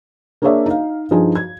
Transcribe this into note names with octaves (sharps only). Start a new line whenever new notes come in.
A#3 D4 G#4 C#5 D5 E5
D#4 F5
G2 F3 D#4 G#4 G#5
G#6